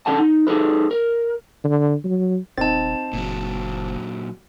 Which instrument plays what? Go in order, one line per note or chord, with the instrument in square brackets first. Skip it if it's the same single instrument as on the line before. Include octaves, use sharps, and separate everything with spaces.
[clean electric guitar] C#4 D4 A4 F#5 A5
D#4
D#4 G#4 A4 B4
A#4
[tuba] D3
F#3
[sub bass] D#1 [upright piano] C4 D#4 [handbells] A5 A6
[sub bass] F#1 [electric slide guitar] A#2 F#3